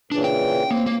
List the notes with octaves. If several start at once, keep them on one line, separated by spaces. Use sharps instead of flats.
A#2 C#3 E3 D4
G5
A#3 C4
A#3